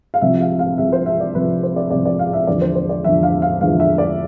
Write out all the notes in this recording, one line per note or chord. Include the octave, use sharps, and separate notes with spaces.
F5
C2 C3 F3 E5
E5
F5
F5
C2 C3 F3 E5
C5
E5
D5
C2 C3 F3 B4
C5
D5
C2 C3 F3 D5
D5
F5
E5
E2 D3 F3 D5
C5
C5
D5
E2 D3 F3 E5
F5
F5
E2 D3 F3 F5
E5
D5